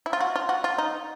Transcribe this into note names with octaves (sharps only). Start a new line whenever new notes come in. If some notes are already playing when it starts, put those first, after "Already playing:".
E4
F4
F#4
F4
F#4
F4
D#4